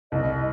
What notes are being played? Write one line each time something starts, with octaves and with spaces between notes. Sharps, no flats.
C2 D#5